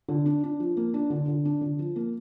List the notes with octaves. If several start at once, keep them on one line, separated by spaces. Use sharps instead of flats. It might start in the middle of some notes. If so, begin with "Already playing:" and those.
D3
D4
D4
F3
A#3
D4
D3
D3
D4
D3
F3
A#3